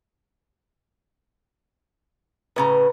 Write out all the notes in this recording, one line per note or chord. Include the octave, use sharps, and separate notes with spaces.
A2 C#3 B4 A#5